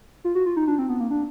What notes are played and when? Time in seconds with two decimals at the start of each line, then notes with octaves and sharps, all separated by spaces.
0.24 F4
0.35 F#4
0.46 F4
0.57 D#4
0.67 D4
0.79 C4
0.89 B3
1.00 A#3
1.11 D4